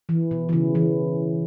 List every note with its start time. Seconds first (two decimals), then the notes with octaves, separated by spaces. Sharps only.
0.09 E3
0.31 B2
0.49 E3
0.53 C#3
0.75 E3